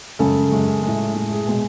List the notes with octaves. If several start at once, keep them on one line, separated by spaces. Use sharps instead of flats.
F#2 C#3 G#3 A4
F#2 C#3 G#3
A2 G#3
A2 G#3
G#4
B2 G#3 G#4